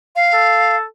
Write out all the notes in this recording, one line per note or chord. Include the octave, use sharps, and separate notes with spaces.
F5
A4